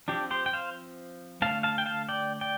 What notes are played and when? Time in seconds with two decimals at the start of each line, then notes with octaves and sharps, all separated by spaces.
0.08 F3 C4 D4 G4
0.30 G4 C5
0.46 G5
0.53 C5 F5
1.42 D3 A3 C4 F5 A5
1.63 F5 A5
1.78 G5
1.86 F5 A5
2.09 D5 G5
2.41 D5 G5